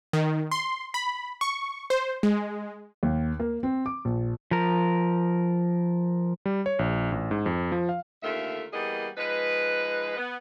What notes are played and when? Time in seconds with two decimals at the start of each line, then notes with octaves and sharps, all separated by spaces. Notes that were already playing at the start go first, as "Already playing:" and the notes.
0.13 D#3
0.51 C6
0.94 B5
1.41 C#6
1.90 C5
2.23 G#3
3.03 D#2
3.40 A#3
3.63 C4
3.86 D6
4.05 A#1
4.51 F3 A#4
6.46 G3
6.66 C#5
6.79 A#1
7.12 A1
7.31 G#2
7.46 F2
7.72 F3
7.89 F5
8.23 D#2 D3 A3 F4 A#4 E5
8.72 E3 G3 A#3 B3 G#4 D#5
9.17 F3 G#3 D#4 B4
10.17 B3